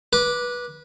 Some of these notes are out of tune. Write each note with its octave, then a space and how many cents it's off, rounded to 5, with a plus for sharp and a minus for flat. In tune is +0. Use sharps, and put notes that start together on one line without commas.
B4 -20 D6 +0